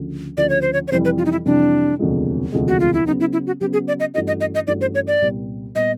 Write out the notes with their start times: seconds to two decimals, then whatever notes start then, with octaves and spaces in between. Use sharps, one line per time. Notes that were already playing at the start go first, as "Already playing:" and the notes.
Already playing: D2 C#3 F3
0.37 D2 C#3 F3 D5
0.49 C#5
0.62 C5
0.73 C#5
0.88 C#5
0.92 F2 C3 E3 G3 C5
1.05 B4
1.18 F4
1.25 D#4
1.32 E4
1.45 F2 C3 E3 G3 D4
1.99 E1 D2 C3 F3 G#3
2.52 E1 D2 C3 F3 G#3
2.68 F#4
2.80 F4
2.94 E4
3.06 C#3 F#3 B3 D#4
3.20 E4
3.33 E4
3.47 F#4
3.61 C#3 F#3 B3 G4
3.73 G#4
3.88 D5
4.00 D#5
4.14 G2 E3 A3 C#4 F#4 D#5
4.27 D#5
4.40 D#5
4.55 D#5
4.67 G2 E3 A3 C#4 F#4 D5
4.81 C5
4.95 C#5
5.07 D5
5.22 C2 A#2 G3 B3
5.75 A#2 G3 B3 D#5